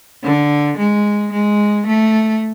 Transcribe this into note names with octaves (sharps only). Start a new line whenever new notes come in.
D3
G#3
G#3
A3